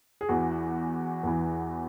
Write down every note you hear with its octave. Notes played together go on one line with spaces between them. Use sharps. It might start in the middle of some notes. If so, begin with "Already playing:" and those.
G#4
E2 E3 F#4
E2 E3